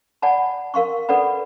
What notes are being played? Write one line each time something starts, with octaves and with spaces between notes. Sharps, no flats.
D5 F#5 G#5 A5 B5
A#4 F5 C6 C#6
A4 B4 D5 F#5 B5